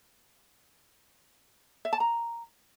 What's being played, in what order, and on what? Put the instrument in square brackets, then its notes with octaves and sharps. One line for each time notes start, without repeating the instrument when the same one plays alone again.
[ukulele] E5
A5
A#5